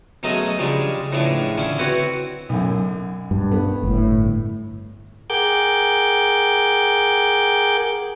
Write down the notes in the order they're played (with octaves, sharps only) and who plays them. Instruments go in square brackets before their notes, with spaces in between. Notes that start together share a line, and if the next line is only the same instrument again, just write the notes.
[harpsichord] B2 F#3 G#3 A3 C#4 D#5
C#3 F3 G3 G#3 D4
A2 C#3 E3 F3 G#3 D4
D3 C#4 E4
C4 E4 F#4 B4 C#5
[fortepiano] B1 F#2
[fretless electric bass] G2
[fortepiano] B3
[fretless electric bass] G1 A2
[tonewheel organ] G#4 A#4 F#5 G5 D6 G6